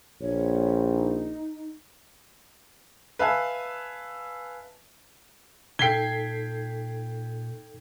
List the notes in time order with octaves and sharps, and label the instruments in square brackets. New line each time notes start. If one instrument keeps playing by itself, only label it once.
[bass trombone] A#1 [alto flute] C#5
[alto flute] D#4
[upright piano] B4 E5 F5 G#5 A5
[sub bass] A#2 [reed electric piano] D#4 A4 [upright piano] G5 G7 [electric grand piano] G#6 B6 C7